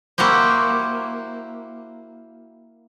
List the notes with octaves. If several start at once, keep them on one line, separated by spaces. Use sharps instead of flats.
A#3 E4 F#4 G4 C5